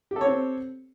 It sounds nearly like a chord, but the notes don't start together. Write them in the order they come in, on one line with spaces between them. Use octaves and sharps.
G4 A4 C#5 C4